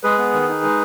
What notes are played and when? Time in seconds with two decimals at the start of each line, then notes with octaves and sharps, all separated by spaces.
0.03 G#3 G#4 B4
0.18 B3
0.33 D#3
0.49 D#4
0.64 G#3